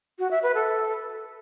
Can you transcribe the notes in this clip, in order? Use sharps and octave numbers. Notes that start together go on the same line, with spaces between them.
F#4
E5
B4
A4